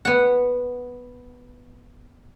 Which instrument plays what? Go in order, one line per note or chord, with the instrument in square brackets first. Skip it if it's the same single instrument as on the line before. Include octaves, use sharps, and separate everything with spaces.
[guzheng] B3 F#5